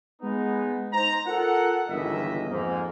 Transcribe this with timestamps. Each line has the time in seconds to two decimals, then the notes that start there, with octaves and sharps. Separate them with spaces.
0.22 G#3 B3 D#4
0.93 D#4 C5 A#5
1.27 F4 A4 A#4 F#5
1.89 G1 C#2 D#3 E3 D#5 E5
2.49 F2 G#2 A#3